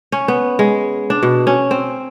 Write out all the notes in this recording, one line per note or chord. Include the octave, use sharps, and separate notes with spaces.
C#4
B3
G#3
D4
B2
C#4
C4